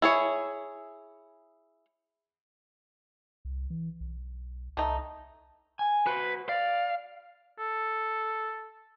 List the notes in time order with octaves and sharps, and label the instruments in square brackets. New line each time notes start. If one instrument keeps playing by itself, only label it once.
[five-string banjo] E4 G#4 C#5
[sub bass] C2
E3
B1
[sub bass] C2 [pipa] A3 D#4
[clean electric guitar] G#5
[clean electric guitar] F#4 C5 [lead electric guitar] B4
[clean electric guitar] D5 [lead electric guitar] F5
[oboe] A4